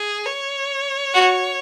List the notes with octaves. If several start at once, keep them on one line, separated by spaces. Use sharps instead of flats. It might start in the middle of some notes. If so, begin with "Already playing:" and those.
Already playing: G#4
C#5
F#4